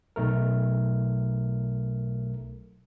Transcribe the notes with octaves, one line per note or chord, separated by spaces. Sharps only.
B1 A3 A#4